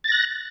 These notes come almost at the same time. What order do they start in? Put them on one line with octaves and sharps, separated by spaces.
A6 A#6 F#6